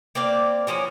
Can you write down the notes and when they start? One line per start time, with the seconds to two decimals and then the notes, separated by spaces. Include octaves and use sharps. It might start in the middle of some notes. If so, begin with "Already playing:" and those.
0.15 A#3 C4 D5 F5
0.67 E3 F3 C#4 F#4